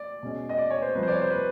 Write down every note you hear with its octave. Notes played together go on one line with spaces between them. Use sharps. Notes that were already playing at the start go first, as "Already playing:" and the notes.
Already playing: D5
B2 G#3 C#4
D#5
D5
C#5
C5
C2 C3 F3 B4
C5
D5
C#5
C5
B4